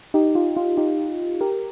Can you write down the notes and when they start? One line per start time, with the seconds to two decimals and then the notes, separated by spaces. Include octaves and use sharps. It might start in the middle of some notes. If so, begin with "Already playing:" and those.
0.14 D#4 G4
0.35 F4
0.57 F4
0.77 D#4 G4
1.41 G4 A#4